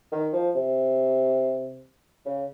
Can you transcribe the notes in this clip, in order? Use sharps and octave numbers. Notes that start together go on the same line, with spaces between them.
D#3
F3
C3
C#3